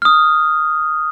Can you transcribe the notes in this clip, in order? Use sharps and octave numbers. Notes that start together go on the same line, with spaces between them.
D#6 F6